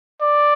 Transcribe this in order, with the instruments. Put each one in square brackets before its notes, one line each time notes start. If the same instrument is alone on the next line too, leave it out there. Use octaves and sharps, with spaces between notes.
[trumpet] D5